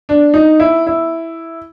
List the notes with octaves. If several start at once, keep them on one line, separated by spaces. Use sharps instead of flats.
D4
D#4
E4
E4